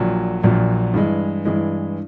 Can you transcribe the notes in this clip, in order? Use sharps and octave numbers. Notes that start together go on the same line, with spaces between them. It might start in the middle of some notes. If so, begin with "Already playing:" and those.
Already playing: A#1 A#2 F#3
A#1 A#2 F#3
G2 E3 G#3
G2 E3 G#3